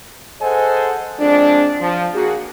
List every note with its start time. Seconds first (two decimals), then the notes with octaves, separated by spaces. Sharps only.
0.41 G#4 A4 C5 D#5 F#5 G#5
1.19 F3 G#3 C4 D4
1.80 F3
2.14 A#3 F#4 G#4